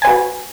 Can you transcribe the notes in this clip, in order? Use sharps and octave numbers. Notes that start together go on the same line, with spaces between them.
F#4 B4 G#5